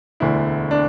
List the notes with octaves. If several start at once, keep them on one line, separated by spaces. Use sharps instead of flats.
E1 D2 D3 E4
D4